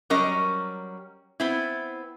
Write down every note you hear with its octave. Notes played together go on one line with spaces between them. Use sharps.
F#3 G3 C#4 A#4 D#5
B3 C4 E4